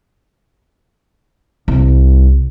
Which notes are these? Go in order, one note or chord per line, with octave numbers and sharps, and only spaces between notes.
C2